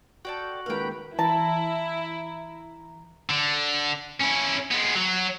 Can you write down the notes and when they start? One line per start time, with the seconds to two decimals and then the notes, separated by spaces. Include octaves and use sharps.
0.25 F#4 A4 D5 G5
0.66 C#2 D#3 A#3 B4 F5 G5
1.19 E3 E4 A5 A#5
3.30 D3
4.20 C#4 E4
4.71 G#3 B3
4.96 F#3